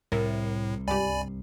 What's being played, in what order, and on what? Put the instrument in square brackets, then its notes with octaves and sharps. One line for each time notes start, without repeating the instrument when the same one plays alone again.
[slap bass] C2 [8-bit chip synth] A2 [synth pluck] A#4 E5
[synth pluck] C#2 G2 G4 [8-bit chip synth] D5 G#5 B5